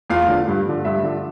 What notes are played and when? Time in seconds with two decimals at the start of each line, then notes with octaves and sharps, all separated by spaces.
0.10 E2 F4 F5
0.28 D3 F3
0.48 G2
0.66 D3 F3
0.85 G2 E5
1.03 D3 F3